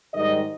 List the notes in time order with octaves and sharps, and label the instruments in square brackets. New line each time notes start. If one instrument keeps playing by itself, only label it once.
[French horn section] G#2 D#3 G3 D#5